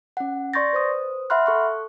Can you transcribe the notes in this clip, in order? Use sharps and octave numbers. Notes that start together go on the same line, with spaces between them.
C#4 F#5
D5 C6 C#6 G6 A6 A#6
B4 C5 D#6
E5 F#5 B5 C6 F6 F#6
A4 C#6 F#6